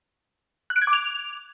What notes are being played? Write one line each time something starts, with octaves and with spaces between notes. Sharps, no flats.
F#6
D7
G#6
D6
F7